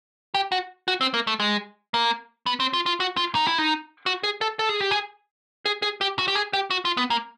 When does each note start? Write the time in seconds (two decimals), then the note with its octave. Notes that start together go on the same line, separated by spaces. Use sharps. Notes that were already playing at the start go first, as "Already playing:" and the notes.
0.34 G4
0.52 F#4
0.88 F#4
1.01 C4
1.14 A#3
1.27 A3
1.40 G#3
1.94 A#3
2.46 B3
2.60 C4
2.73 F4
2.86 F4
3.00 F#4
3.17 F4
3.35 D#4
3.47 E4
3.58 D#4
4.06 F#4
4.24 G#4
4.41 A4
4.59 A4
4.69 G#4
4.80 G4
4.91 G#4
5.66 G#4
5.82 G#4
6.01 G4
6.19 F#4
6.28 G4
6.35 G#4
6.53 G4
6.71 F#4
6.85 F4
6.97 B3
7.10 A#3